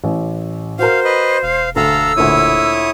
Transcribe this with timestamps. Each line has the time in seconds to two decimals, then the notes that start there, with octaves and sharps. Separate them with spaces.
0.04 A1 A2
0.79 F#4 A#4 C5 F5
1.04 B4 D#5
1.43 E1 F5
1.76 D2 A4 F5 A#5 E6
2.17 D2 A#2 E4 C#5 D#6